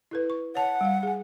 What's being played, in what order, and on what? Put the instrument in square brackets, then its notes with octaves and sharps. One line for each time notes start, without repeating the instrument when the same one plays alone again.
[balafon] E4 A4 B4
C#6
[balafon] C#5 A5 [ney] F#5
[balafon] G3 F5
G#4 G#5